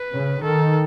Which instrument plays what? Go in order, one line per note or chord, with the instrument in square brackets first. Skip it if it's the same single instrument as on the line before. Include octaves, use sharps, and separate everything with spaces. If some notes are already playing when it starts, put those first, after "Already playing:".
Already playing: [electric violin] B4
[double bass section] C#3
[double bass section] D#3 [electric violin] A4